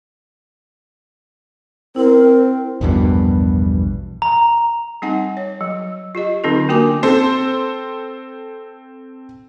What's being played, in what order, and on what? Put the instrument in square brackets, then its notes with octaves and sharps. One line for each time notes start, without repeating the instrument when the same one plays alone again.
[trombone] C4 [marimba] E4 [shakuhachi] A#4
[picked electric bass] A#1 E2 G2 B2
[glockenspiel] A#5
[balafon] G3 C4 D#4 F#5 G#5
C#5
F#3
F4 G4 D#5
D3 F#3 C4 D#4 F4 A4
A#3 D4 F#4 A#4 G#5 D6
[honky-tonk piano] C4 A4 C5